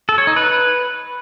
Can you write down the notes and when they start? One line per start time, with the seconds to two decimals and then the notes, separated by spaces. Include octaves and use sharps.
0.09 A4
0.18 C#5
0.27 D#4
0.36 B4